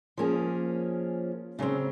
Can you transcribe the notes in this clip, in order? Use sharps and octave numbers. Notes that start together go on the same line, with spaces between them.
F3 A#3 C#4 G#4
C#3 F#3 C4